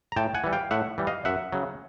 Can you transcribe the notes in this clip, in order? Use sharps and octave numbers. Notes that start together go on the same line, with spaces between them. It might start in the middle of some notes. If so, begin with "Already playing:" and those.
A#5
A2 G5 A5
F#5 G#5
E3 G3
F5 G5
A2 E5 F#5
E3 G3
D#5 F5
F#2 E5 F#5
C#3 F#3